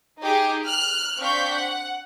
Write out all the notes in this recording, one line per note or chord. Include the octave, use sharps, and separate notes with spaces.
D#4 G4 G#4
F6 F#6
C4 D4 F5 C#6 G6 B6
F#5